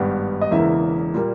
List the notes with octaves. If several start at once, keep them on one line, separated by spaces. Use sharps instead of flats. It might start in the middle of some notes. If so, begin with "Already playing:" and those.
Already playing: G#1 G2 G3 B3
D#5
E1 E2 C#3 E3 A#3 E5
A#2 G3 A#3